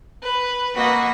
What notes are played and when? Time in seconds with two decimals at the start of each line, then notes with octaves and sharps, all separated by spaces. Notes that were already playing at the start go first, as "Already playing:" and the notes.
0.23 B4
0.75 A#3 F#4 B4 D#5